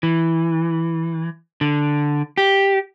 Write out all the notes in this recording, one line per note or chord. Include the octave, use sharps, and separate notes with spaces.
E3
D3
G4